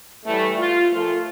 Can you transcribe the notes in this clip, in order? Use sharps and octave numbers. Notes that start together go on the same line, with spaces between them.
A2 E3 G3 A3
F4
A#2 F3 A3 F4